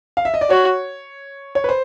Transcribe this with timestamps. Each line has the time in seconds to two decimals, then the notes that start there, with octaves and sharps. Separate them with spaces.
0.17 F5
0.25 E5
0.34 D#5
0.41 D5
0.50 F#4 C#5
1.55 C#5
1.64 B4
1.69 C5